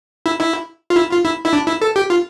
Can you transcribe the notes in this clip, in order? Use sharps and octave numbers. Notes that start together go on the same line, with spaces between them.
E4
E4
F4
E4
F4
E4
E4
D4
E4
A4
G4
F4